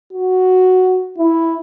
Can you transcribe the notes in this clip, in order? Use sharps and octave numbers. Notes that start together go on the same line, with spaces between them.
F#4
E4